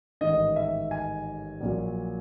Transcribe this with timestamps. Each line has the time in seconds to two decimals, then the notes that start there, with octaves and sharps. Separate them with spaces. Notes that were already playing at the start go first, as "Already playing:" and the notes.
0.21 A1 G#2 D#3 D#5
0.56 E5
0.91 G#5
1.61 A#1 A#2 F#3